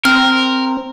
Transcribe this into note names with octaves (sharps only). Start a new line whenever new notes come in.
C4 A#4 F6